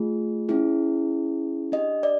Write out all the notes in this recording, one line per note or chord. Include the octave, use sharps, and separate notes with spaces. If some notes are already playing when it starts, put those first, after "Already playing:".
Already playing: A3 F4 G#4
C#4 E4 G#4
D4 G4 D#5
D5